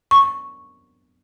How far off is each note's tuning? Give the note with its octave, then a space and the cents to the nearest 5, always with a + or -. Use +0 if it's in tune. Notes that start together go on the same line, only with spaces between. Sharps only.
C#6 -5